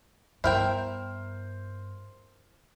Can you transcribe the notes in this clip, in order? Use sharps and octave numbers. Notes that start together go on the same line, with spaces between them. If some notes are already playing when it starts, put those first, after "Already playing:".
G2 B3 E4 A#4 C5 G5 F6